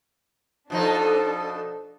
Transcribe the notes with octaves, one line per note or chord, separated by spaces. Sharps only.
B2 F3 D4 D#4 A4